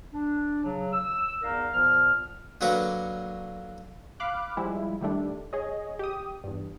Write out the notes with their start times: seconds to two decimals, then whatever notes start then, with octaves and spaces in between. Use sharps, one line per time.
0.13 D4
0.64 C#3 F#3
0.93 E6
1.42 E2 D#4 A#4 D5 F5
1.72 A#2 F3 B3 F6
2.61 D3 F#3 A#3 B4 C#6 D6
4.20 F5 B5 D6 F#6
4.57 F3 G3 G#3 E4
5.01 D#3 G3 A3 D4
5.53 G#4 C#5 D#5
5.99 G4 D#6
6.44 E2 G2